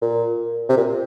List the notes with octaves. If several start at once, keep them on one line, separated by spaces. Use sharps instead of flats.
A#2
C3
A#2